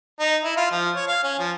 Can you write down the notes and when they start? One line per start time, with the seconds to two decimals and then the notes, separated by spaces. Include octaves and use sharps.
0.19 D#4
0.44 E4
0.57 F4
0.71 F3
0.95 C#5
1.08 F5
1.23 C#4
1.39 F3